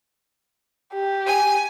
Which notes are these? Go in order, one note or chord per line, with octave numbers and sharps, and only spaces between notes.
G4
G#5